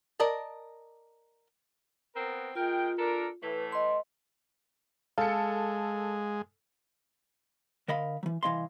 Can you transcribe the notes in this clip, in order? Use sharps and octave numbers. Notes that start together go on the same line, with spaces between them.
A#4 D5 D#5 A5
B3 C4 A#4
G#3 F4 A#4 G5
D4 A4 A#4
A2 E3 A3 B4
D#5 C6
G#3 A4 F5 C#7
D3 A#4 D#5 F5 B5
E3 F#3
C2 E3 B3 D#5 F5 C6